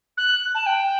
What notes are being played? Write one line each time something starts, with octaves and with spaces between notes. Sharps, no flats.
F#6
A5
G5